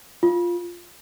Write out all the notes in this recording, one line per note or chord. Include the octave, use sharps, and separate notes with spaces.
F4